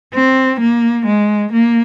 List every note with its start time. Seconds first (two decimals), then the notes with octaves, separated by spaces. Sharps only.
0.14 C4
0.60 A#3
1.06 G#3
1.53 A#3